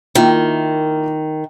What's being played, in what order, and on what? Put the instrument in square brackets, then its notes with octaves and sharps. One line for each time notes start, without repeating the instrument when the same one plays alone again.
[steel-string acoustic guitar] D#3 [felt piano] A#3 E4 F4